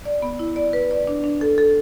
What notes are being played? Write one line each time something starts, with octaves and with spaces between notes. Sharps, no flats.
D5
B3
E4
D5
B4
D5
D4
D4
A4
A4